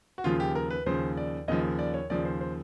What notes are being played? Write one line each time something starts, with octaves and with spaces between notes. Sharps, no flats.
F#4
D#2 C#3 F3 F4
G4
A#4
B4
D#2 C#3 F3 C5
D5
D#2 C#3 F3 D#5
D5
C#5
D#2 C#3 F3 D5
C5
C5